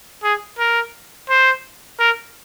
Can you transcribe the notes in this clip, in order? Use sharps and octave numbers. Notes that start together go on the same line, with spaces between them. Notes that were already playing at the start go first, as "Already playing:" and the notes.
G#4
A#4
C5
A#4